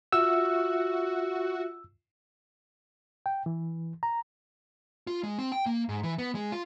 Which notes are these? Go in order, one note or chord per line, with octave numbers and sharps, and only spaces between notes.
F4 F#4 E5 E6
G5
E3
A#5
F4
G#3
C4
G5
A#3
G#2
E3
B3
G#3
F4